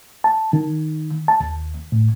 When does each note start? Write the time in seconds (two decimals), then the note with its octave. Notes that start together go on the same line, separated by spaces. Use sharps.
0.24 A5
0.53 D#3
1.28 A5
1.40 D#2
1.92 A2